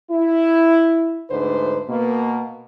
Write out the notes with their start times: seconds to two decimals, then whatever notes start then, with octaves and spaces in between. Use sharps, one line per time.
0.11 E4
1.30 D2 G#2 D4 B4 C5
1.89 B2 A#3